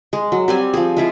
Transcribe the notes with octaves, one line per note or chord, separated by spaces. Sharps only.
G#3
F#3
G3 C4 G#5
F3 G3 G#4
G#3 E4 F4